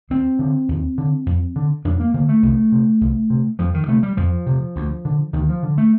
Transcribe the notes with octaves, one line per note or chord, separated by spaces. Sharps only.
D#2 C4
D3
D#2
D3
F2
D3
F2 D4
A#3
D3 A#3
A3
C2
C3
C2
C3
F2 F3
D#3
C3 A3
G3
F2 F3
C3
D2
D3
D2 D#3
F3
D3
A3